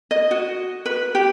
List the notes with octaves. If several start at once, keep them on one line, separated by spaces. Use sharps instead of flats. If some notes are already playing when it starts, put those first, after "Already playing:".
D#5
F#4
B4
G4